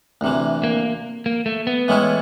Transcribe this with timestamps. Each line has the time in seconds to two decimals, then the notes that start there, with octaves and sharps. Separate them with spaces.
0.21 D2 C3 E3
0.64 A#3
1.26 A#3
1.46 A3
1.67 B3
1.88 A2 E3 G#3 C#4 E4